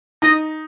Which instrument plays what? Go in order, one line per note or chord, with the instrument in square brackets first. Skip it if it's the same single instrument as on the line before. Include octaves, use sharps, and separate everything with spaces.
[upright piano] D#4 [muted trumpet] D#5